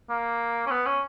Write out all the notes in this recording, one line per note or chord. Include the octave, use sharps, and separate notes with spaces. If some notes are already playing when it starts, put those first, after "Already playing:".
A#3
C#4
B3
C#4